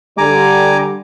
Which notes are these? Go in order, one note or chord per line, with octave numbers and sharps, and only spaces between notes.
D3 G3 G#5 A#5 D6